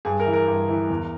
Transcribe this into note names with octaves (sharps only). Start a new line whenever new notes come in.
G2 G#4
A#4
E3
A#4
G2
E3
E2